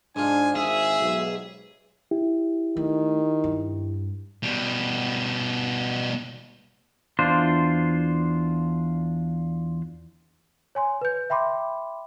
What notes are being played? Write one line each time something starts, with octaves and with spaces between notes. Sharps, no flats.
G#2 D4 F4 G#5
G#1 G#4 E5 G#5
B1
E4 G4
D#3 A3
G2
B2 G3
E2 D4 F4 C5
C#5 G#5 C6
B4 G6
E5 G5 B5 C6 D6